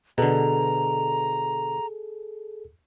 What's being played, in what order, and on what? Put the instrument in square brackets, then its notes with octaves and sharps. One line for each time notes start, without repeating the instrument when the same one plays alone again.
[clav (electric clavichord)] B2 D3 [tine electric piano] G#4 A4 [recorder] A#5